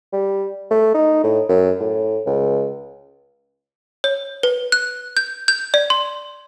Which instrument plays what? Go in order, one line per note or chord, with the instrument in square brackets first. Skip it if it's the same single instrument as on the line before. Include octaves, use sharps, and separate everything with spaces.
[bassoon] G3
A3
D#4
A2
F#2
A2
C#2
[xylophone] C#5
B4
F#6
G6
G6
D5
C6